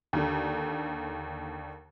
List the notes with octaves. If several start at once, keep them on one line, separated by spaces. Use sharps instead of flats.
D#2 D3